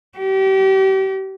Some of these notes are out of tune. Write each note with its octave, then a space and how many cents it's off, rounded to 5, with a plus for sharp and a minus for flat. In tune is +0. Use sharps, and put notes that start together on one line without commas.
G4 -35